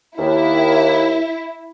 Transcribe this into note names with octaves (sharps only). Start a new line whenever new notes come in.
D#2 E4